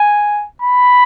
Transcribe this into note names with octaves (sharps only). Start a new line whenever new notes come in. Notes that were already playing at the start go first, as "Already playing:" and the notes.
Already playing: G#5
B5